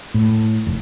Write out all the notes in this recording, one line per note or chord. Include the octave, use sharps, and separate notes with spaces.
A2
F1